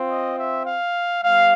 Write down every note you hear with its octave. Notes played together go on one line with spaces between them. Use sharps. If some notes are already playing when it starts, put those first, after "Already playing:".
Already playing: C4 F4
D#5
E5
F5
G3 B3 F5